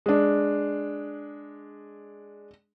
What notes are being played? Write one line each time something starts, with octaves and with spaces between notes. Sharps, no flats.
G#3 D4